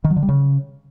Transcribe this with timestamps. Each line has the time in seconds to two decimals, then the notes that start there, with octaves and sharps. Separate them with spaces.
0.04 D#3
0.10 F#3
0.16 D3
0.23 G3
0.29 C#3